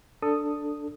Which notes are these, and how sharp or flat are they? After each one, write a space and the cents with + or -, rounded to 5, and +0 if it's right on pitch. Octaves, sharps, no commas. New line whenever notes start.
D4 +0 A4 +10 D#6 -5